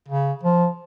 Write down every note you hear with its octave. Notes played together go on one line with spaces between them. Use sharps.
C#3
F3